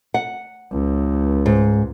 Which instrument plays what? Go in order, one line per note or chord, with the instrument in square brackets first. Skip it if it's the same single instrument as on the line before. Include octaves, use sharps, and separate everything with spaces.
[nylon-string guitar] F#5
[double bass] C#2
[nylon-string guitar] G#2